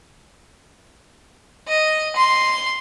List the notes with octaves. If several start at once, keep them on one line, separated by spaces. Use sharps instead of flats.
D#5
C6